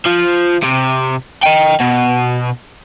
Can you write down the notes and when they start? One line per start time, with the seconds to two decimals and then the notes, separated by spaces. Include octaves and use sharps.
0.06 F3
0.63 C3
1.44 D#5 G5
1.80 B2